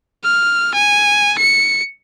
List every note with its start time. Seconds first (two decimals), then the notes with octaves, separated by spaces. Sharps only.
0.24 F6
0.74 G#5
1.39 C#7